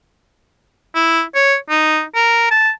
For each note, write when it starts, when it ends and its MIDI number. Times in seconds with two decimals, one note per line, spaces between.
0.95 1.22 64
1.35 1.56 73
1.70 2.03 63
2.15 2.47 70
2.51 2.70 81